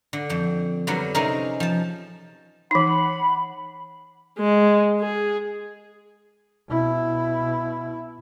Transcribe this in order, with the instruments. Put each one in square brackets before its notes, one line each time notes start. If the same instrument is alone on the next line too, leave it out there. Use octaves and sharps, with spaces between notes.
[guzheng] D3
F2 G5
D3 F#3 G3 B3 A#4
C3 C4 C#4 D#4 G#4 A#4
F3 A5
[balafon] E3 D#4 [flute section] F#5 B5
[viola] G#3
G#4
[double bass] B2 E4